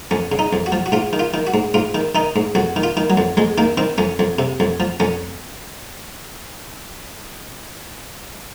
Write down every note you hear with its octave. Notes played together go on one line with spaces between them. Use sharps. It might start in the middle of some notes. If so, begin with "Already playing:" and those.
F2 C#4
C#3
D#4
F2
F#4
F3
F#4
G#2 F4
D#3
F4
D#3
F#4
G#2
G#2 F4
D#3
D#3 D#4
G#2
F2 F#4
D#3
F4
D#3
F#3
F2
F2 G#3
D#3 A#3
D#3 C4
F2 C#4
F2
C3
F2
F3
F2 C#4